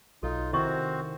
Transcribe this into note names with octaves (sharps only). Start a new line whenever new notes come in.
B1 D#4 F4 A4
C3 D#3 C4 E4 F#4 C5 D#5 C#6